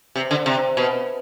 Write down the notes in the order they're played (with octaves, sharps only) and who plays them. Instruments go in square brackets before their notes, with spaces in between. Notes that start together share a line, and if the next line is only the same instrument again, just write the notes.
[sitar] C3
D3
C3
B2